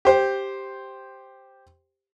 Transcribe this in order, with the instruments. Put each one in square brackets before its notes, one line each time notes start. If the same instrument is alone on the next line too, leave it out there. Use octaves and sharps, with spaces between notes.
[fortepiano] G4 C5